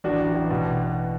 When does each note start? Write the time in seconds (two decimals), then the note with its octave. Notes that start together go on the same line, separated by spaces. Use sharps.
0.04 A1 D4 F#4
0.20 A1
0.35 A1
0.50 B2